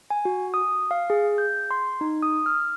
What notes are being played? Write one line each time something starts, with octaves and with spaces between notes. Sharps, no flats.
G#5
F#4
D#6
F5
G#4
G6
C6
D#4
D#6
F6